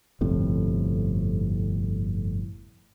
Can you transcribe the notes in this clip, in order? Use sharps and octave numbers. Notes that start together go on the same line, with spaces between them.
G1 F2 A2 C3